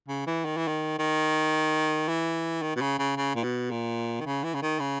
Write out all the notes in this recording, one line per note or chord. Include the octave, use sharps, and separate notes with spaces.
C#3
E3
D#3
E3
D#3
D#3
E3
D#3
B2
C#3
C#3
C#3
A#2
B2
A#2
D#3
C#3
E3
C#3
D#3
C#3